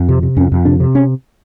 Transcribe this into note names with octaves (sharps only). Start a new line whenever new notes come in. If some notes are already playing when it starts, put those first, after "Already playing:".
Already playing: F2
C3
C3
F2 C#4
F2
C3 D4
C3
C#4